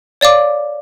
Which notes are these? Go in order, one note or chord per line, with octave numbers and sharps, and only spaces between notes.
C#5 D5 F5 D6